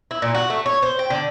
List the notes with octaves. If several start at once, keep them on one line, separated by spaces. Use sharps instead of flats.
E4
A#2
F#4
A3
C#5
C5
G5
D3